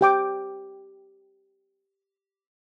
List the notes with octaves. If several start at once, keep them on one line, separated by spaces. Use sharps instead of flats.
G4 G5 D6